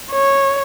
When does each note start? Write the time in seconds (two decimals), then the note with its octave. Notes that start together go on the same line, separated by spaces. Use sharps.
0.12 C#5